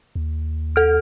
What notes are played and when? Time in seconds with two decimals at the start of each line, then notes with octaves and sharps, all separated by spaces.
0.15 D#2
0.76 A4 F6